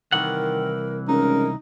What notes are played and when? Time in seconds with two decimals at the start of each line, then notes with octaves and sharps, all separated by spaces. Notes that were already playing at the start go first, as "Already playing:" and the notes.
0.12 C2 D#3 E3 A#4 F#5
1.08 C#2 D#4 A#4